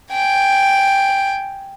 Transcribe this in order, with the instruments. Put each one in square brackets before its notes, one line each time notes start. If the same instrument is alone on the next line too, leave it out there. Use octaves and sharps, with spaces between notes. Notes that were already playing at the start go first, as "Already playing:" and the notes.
[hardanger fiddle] G5 G#5